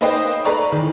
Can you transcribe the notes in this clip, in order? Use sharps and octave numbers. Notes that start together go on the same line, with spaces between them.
A#3 D#4 B4 C5 D#5 G5
A4 B4 D5 A#5 C#6
D#3 E3